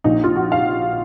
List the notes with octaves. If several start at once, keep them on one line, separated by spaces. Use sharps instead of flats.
A#1 A#2 D#4
F4
F#4
F5